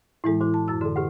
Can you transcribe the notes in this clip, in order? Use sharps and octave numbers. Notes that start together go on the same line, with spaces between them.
A2 E3 G#3 E4 A4
F#4 C5 D6
A5
F#2 E6
D3 F#4 A4
G4 B4 F#5